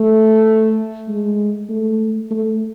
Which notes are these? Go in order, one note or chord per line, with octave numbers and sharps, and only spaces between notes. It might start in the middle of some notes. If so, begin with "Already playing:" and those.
Already playing: A3
G#3
A3
A3